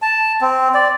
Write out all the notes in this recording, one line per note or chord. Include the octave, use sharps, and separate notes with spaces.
A5
C4
D5